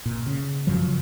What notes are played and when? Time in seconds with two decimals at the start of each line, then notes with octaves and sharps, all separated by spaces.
0.05 A#2
0.26 C#3
0.67 F#2 C#3 F3 F#3